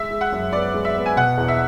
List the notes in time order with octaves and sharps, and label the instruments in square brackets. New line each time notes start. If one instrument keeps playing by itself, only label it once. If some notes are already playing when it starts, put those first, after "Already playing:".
Already playing: [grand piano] G#3 [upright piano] E5
[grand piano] G#3
[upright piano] F#5
[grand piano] F#2
[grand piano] B3 [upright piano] D5
[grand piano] G#3
[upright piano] E5
[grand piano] B3
[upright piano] G#5
[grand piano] B2 [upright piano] F#5
[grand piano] E2
[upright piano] E5